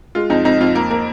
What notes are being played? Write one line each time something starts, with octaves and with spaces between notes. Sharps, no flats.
G#3 F4
F2 D#4
F2 D#4
F2 F4
A#3 A#4
A#3 A#4